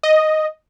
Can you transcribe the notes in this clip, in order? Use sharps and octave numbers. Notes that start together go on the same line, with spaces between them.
D#5